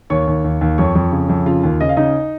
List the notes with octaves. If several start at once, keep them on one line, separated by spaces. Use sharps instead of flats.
D#2 C#5 C#6
D#2
D#2
D#2
F2 C#5 C#6
F2
C#3
F2
C#3 F4 F5
D#2
C#3 D#5
F5
C#3 D#4 D#5